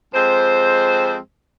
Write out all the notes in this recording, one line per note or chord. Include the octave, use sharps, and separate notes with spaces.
F2 G#3 C4 C5